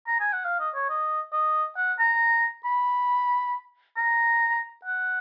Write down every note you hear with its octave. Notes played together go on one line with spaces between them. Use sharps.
A#5
G#5
F#5
F5
D#5
C#5
D#5
D#5
F#5
A#5
B5
A#5
F#5